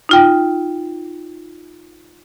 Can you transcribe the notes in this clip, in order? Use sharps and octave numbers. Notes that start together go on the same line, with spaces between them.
D#4 F4 G5